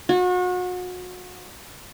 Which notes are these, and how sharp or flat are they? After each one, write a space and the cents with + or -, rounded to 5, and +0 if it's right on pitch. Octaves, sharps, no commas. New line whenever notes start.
F#4 -35